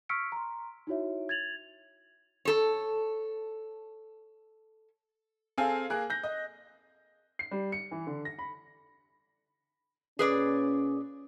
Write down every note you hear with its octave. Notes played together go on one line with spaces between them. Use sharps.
C#6 E6 F6 B6 C#7 D7
A#5 C6
D#4 E4 F#4 C#5 E5
G#6 A6 F7 F#7
A4 C#5
C4 G#4 A4 F5 G#5
A#3 G#4 A#4 F#6
G6 A#6
D#5
C7
G3
C#7
E3
D3
A#6
B5
A#2 C#4 G#4 B4 D5